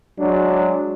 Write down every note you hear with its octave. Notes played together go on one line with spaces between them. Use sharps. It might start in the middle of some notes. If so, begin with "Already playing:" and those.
F#3 G#3 D4